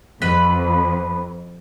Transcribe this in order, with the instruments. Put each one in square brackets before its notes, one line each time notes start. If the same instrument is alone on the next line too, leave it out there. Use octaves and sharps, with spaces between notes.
[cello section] F2 [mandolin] B4 B5